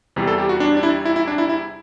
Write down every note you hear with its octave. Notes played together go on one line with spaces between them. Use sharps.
E2 C3 G3
A4
G4
F#4
D4
D4
E4
E4
E4
D4
E4
E4